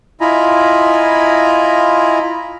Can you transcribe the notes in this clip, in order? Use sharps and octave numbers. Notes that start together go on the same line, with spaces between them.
E4 F4 D#5 G#5 A#5 B5